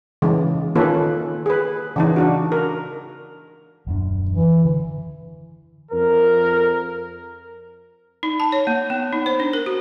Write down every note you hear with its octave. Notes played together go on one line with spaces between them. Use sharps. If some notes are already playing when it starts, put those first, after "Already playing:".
C#3 E3 G#3
D#3 A#3 C#4 F4 A4 B4
G#4 B4
C#3 E3 D#4
D4 F#4
A#4
D#1 F#2 D4
E3
D3
F2 A#4
D#4
A5
C#5
A#3
B3
D#4
C5
D4
A#4
F#4